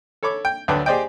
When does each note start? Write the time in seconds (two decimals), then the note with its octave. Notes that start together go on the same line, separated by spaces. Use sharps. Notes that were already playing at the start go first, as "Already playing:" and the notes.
0.23 A4 C#5 B5 D6
0.45 G5
0.68 D2 D3 F#3 D4 B4 G5
0.86 G4 G#4 C5 D5 D#5 G5